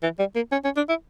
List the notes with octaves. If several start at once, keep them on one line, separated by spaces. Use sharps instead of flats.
E3
G3
A#3
C#4
C#4
D4
E4